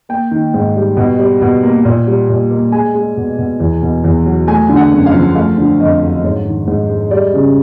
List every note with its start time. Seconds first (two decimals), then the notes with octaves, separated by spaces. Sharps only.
0.09 A#3 G5
0.31 D#3
0.54 G#2
0.76 G3
0.97 B2
1.19 G3
1.41 B2
1.63 A#3
1.85 A#2
2.07 G3
2.29 A#2
2.51 A#3
2.72 G#3 G#5
2.95 G#3
3.17 B2
3.38 B2
3.60 E2
3.82 B2
4.04 E2
4.26 F#3
4.48 A3 G#5
4.69 D3
4.77 F#5
4.91 F#2
5.06 F5
5.14 F3
5.35 A3 F5
5.58 D3
5.80 F2 D#5
6.01 F#3
6.23 G#2 C#5
6.45 D#3
6.67 G#2
6.90 G#3
7.11 G3 D5
7.34 C#3